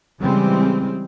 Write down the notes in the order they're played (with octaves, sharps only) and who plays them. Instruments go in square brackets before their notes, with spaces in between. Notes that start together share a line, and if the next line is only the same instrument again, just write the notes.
[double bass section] C#3 E3 G3 G#3 C4